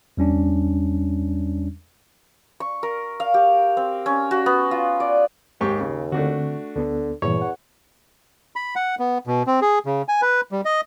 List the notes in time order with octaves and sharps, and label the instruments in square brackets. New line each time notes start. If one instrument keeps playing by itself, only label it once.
[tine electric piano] E2 G3 C#4 D4
[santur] C#6
A#4
F5
G4
C4
C#4
F#4
B3
F4
D5
[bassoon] D#2 [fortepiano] G#2 G4 C#6
[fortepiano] C#3
[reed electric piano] D3 C4 [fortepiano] A3 D4 F#4
[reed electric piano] D2 B3 A4 [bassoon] D3
[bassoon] E2 [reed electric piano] G2 A#2 E3 [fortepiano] C#5
[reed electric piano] F#5
[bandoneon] B5
F#5
B3
B2
C4
G#4
C#3
G#5
B4
G3
D#5